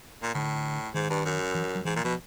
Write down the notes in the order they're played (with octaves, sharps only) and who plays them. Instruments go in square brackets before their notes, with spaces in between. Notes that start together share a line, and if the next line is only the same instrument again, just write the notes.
[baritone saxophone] A#2
[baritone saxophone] A2 [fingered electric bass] D3
[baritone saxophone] G#2 [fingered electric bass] D#3
[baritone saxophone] G2
F#2
[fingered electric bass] E3
F#3
[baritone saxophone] G#2 [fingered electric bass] E3
[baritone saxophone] A#2
[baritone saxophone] B2 [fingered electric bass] F3